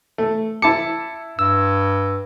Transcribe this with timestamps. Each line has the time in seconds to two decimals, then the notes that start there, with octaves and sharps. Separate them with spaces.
0.18 A3
0.62 E4 A5 D6 C#7
1.39 G2 E6